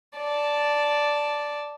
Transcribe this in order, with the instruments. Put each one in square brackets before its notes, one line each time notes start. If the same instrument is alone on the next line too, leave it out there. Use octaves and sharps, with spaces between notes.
[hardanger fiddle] D5 A5